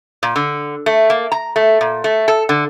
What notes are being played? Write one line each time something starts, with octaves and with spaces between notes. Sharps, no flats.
A#2
D3
A3
A#3
A#5
A3
A#2
A3
A4
D3